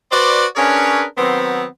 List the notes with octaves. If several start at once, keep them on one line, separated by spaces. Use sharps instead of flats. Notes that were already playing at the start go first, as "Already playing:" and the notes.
F#4 B4 C5 D5
C#4 D4 G#4 A#4 B4 C#5
D#3 F#3 B3 C4